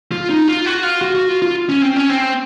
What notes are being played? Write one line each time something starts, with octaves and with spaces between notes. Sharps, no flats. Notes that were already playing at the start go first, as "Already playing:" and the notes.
F4
D#4
F4
F#4
F4
F#4
F#4
F4
F4
C#4
C4
C#4
C4